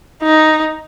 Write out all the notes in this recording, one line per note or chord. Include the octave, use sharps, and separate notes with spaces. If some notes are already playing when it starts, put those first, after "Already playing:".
D#4